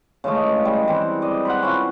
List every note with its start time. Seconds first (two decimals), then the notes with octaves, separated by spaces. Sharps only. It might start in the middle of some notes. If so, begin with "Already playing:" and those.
0.24 C#3 E3 G#3 A3
0.65 G3 G#3
0.88 E3 C4
1.22 D5 D#5
1.45 B4 C5 F#5
1.62 C#4 E4 F4